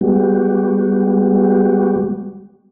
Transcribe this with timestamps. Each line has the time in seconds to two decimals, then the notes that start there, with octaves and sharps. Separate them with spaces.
0.01 G3 G#3 B3 F#4 G4